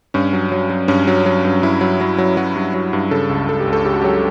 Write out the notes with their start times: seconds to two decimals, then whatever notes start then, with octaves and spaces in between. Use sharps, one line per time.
0.14 G2 C#4
0.33 F#3
0.52 F#3
0.70 F#3
0.88 G2 C#4
1.07 F#3
1.26 F#3
1.45 G2
1.63 G2 E4
1.81 F#3
2.01 F#3
2.18 F#3
2.37 F#3 F#4
2.56 G2
2.74 F#3
2.93 G2
3.11 C#3 A4
3.30 C#2
3.49 C#2 A4
3.60 G4
3.67 C#2
3.73 A4
3.85 C#3 G4
3.94 F#4
4.02 F#3 G4